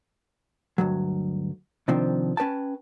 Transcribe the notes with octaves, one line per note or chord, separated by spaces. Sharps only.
D2 G2 F#3
C3 D#3 F3 C4 D4
C#4 B4 G5 A5